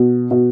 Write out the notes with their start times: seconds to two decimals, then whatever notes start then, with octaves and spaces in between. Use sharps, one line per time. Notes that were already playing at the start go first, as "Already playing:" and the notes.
Already playing: B2
0.31 B2